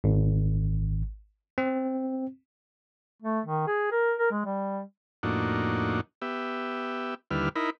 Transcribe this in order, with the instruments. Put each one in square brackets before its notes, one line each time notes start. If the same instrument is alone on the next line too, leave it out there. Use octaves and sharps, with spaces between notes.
[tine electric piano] G#1
C4
[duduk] A3
D#3
G#4
A#4
A#4
G#3
G3
[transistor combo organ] F2 A2 A#3 D4 D#4 F#4
B3 G4 E5
D#2 D3 G3 E4 B4 F6
D#4 E4 A#4 B5